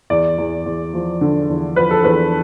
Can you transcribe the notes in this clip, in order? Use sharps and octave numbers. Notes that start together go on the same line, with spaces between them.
E2 D5
E2
E2
F3
D3
E2
F3 B4
A4
E2 B4